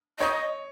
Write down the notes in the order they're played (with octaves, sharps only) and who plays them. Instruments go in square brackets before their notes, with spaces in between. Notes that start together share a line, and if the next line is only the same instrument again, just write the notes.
[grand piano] C#5 [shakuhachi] D#5